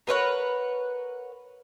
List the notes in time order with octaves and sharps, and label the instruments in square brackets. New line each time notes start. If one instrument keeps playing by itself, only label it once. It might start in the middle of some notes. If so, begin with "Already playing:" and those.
[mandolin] A#4 B4 C#5 F#5